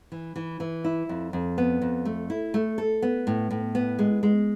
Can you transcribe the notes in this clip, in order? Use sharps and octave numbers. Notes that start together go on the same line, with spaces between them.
E3
E3
E3
E4
F2
F2
B3
F2
A3
E4
A3
A4
B3
A2
A2
B3
G#3
G#3